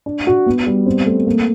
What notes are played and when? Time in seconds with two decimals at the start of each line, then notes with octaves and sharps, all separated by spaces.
0.06 D4
0.27 F#4
0.46 B3
0.66 G3
0.86 C4
1.06 A3
1.27 A#3